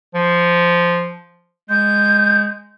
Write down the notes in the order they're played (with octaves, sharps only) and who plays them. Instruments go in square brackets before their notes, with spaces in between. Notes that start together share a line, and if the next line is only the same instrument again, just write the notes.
[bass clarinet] F3
[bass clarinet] G#3 [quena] G6